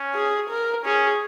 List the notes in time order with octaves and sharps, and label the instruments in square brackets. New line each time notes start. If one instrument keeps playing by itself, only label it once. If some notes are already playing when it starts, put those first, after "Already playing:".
Already playing: [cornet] C#4
[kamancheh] G#4
A#4
[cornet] C#4 [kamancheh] G#4